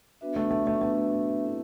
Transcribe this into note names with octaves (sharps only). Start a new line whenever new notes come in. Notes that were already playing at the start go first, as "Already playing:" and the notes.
B3 D4 F#4 B4 E5
A3
A3
A3
A3 B3 D4 F#4 B4 E5
C4 E4 A4